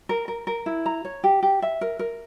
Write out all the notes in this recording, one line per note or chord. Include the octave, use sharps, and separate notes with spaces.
A#4
A#4
A#4
E4
A#5
C#5
G4
G4
E5
A#4
A#4